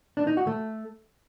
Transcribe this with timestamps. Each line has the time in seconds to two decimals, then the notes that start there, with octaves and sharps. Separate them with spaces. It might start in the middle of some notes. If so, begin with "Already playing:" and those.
0.17 D4
0.27 D#4
0.37 F#4
0.47 A3